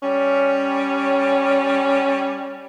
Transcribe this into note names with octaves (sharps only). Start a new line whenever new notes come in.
G3 C#4